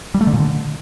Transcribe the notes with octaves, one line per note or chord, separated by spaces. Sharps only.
G3
A3
D3
A#2
D3